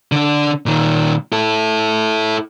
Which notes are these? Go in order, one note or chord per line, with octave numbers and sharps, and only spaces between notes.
D3 D4
A#2 D#3
E4 A4